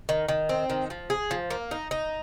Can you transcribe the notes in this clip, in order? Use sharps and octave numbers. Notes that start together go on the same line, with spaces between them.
D#3
D#3
C4
D#3
F3
G#4
F3
A#3
D#4
D#4